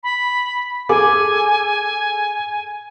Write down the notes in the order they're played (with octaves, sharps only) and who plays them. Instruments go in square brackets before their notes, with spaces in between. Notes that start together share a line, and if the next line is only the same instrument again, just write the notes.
[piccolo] B5
[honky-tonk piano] G#4 A4 D6 [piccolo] G#5